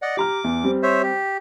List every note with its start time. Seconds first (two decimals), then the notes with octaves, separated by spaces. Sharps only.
0.02 D5 D#5 F#5
0.17 G4 A#5 D6 F6
0.44 E2
0.64 G3 C4
0.83 C5 C#5 E5
1.03 G4